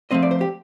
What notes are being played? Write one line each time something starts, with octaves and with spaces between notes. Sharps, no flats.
F3 A3 C4 D#5
D5
C5
G4